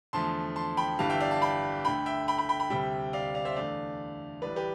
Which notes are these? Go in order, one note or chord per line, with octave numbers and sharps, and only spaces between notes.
E2 D3 F3 A3 A5 C6
A5 C6
G5 B5
G1 G2 E3 G3 F5 A5
E5 G5
D5 F5
F5 A5
G5 B5
D2 D3 A3 G5 B5
E5 G5
G5 B5
G5 B5
G5 B5
G5 B5
D2 C3 G3 E5 G5
D5 F5
D5 F5
C5 E5
E2 D3 A3 D5 F5
A1 A2 G3 B4 D5
G4 B4